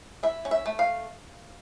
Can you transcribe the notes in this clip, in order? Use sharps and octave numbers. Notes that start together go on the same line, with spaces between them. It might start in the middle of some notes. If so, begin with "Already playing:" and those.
E4 E5
C#4
E5
A3
F5